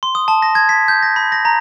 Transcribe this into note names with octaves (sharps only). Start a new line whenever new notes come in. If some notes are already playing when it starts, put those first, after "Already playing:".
C6
D#6
A5
A#6
G#6
B6
G6
A#6
B5
A#6
A#5